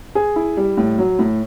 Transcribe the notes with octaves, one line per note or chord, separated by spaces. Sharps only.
G#4
E4
G3
A2
F#3
A2